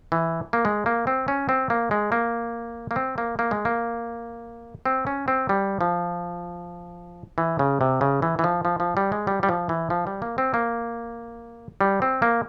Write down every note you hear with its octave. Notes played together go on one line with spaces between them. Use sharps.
E3
A#3
G#3
A#3
C4
C#4
C4
A#3
G#3
A#3
A#3
C4
A#3
A#3
G#3
A#3
C4
C#4
C4
G3
F3
E3
C#3
C3
C#3
E3
E3
F3
F3
F3
G3
G#3
G3
G3
F3
E3
F3
G3
A#3
C4
A#3
G3
C4
A#3